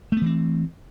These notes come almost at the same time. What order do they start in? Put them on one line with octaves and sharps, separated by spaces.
A3 B3 E3 C4